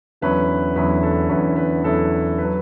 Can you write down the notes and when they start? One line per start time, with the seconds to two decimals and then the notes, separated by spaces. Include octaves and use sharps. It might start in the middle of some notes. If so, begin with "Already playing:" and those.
0.21 E2 D3 F#3 C#4 E4 B4
0.76 E2 D3 F#3 C#4 E4 B4
1.03 A4
1.29 E2 D3 F#3 C#4 E4 B4
1.56 B4
1.83 E2 D3 F#3 C#4 E4 A4
2.38 F#3 B4